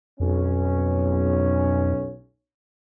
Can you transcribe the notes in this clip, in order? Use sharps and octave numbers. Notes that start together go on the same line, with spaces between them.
B1 F2 C#4